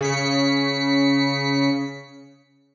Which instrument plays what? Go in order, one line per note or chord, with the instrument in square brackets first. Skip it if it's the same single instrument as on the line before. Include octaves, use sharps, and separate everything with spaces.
[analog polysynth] C#3 B6 C#7